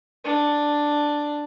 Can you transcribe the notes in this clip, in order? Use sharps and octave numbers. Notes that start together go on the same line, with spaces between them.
D4